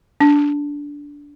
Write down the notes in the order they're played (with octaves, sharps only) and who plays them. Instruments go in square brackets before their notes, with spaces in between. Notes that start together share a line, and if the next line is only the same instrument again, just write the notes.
[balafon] D4